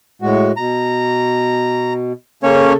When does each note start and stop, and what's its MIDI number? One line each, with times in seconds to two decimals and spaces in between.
0.22 0.52 45
0.22 0.52 56
0.22 0.52 66
0.57 2.13 47
0.57 1.93 82
2.43 2.76 49
2.43 2.73 58
2.43 2.73 61
2.43 2.76 69
2.43 2.73 73